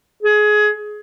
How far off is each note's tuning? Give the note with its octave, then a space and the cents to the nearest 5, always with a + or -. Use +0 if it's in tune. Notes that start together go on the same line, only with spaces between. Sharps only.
G#4 +20